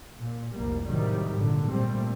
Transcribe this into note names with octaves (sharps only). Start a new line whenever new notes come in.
A#2
F1 C2 G3 A#3
A2 C3 D#3 F#3 G3
G#1 A#2 D3
A#2 G3 A3 C4